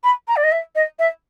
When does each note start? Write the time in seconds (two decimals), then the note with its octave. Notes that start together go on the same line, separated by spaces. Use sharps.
0.03 B5
0.27 A#5
0.36 D5
0.43 D#5
0.52 E5
0.75 D#5
0.99 E5